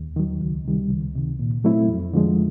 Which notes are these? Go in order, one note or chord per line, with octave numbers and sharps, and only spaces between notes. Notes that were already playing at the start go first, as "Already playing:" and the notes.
Already playing: D#2
D#3 F#3
C#2
C3 D#3 G3
C#2
C3 D#3
A#2
F#3 A3 C4 E4
F2
D3 F3 G#3